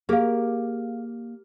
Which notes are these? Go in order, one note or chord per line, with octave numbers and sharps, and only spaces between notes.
A#3 G4 G#4 A#4 F5